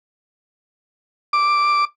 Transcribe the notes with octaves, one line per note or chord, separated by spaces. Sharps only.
D6